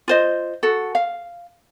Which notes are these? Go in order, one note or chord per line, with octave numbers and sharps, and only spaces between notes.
F4 C5 D#5
F#4 A4
F5